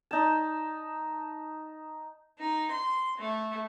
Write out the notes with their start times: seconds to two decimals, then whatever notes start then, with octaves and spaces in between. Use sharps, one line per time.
0.11 D#4 A5
2.39 D#4
2.73 C6
3.19 A3